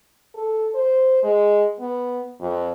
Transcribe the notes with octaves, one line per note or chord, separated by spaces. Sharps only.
A4
C5
G#3
B3
F2